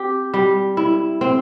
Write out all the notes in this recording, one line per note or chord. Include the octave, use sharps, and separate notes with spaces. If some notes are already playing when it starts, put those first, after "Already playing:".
Already playing: C4 G4
G3
E4
C4